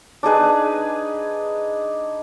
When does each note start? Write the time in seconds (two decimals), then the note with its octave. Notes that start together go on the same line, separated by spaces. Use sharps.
0.23 D4 D#4 G#4 B4